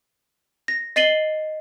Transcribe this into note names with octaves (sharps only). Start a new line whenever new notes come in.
A#6
D#5 A6 C7 D#7 F#7 G7